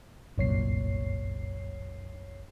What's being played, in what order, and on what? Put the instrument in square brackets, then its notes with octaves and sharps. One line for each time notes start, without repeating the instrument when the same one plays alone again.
[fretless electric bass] G1 C2 A#2 [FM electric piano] F#2 C#5 C7